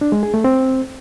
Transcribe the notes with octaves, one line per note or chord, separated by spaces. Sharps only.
D4
G#3
G#4
A3
C4